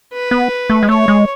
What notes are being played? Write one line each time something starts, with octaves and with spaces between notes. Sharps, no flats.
B4
B3
A3
G#3
A3 C#5
G#3